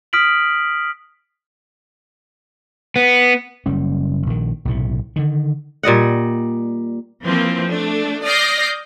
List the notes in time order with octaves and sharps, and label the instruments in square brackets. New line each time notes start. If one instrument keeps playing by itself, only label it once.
[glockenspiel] D#6 F6 B6 D7 F#7
[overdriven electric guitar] B3
[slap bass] F#1 G3 C#4
A#1 D#3
B1 A2 C3
D3 D#3
[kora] A#2 G3 D#5 F#5
[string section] E3 F3 A#3 C4
A3 D4
D5 D#6 F6 G6 A#6 C7